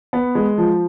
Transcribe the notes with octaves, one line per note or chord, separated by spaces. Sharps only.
B3
G#3
F3